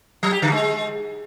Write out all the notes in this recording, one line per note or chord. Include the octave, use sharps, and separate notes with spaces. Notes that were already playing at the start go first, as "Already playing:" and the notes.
F#3
G4
D3
G#3